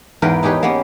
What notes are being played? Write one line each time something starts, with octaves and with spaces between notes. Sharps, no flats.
E2 G#2 A#4 B4 F5 G5
D#4 G4 G#4 B4 C#5
A#3 B3 C#4